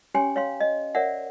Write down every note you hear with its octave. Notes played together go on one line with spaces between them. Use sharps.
C#4 G4 C#5 G5 G#5 C6
C#5 F5 C6
D#5
A#4 C#5 D5 E5 F#5